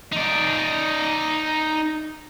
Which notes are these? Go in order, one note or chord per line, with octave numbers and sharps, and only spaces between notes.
D#4 D5